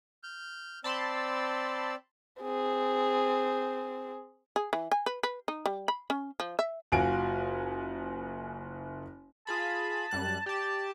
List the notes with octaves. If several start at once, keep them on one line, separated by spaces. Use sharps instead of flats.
F6 G6
C4 D5 A5 B5 C6 E6
C4 G#4
G#4
E3
G#5
B4
B4
D#4
G3
B5
C#4
F3
E5
F#1 F4 F#4 G#5 D7
F4 G#4 A5 B5
F#2 G3 F#6
G4 D5 A5